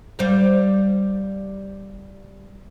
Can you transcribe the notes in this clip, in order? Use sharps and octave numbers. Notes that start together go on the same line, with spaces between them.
G3 C5 F5